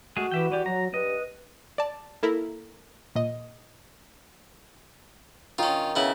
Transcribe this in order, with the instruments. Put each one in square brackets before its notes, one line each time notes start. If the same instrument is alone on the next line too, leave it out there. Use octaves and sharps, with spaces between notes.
[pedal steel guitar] G#3 A3 G#4 [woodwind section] F#4
[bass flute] E3 [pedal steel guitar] G4 E5 G5
[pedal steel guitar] E3 G4 [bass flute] D5
[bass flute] F#3 [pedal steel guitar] A#5
[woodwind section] G2 [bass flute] B4 [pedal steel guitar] D#5
[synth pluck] D5 A5
A#3 E4 A4 A#4
A#2 D#5
[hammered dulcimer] D#3 D#4 [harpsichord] C#4 F4
[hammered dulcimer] C#3 [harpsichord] B3 E4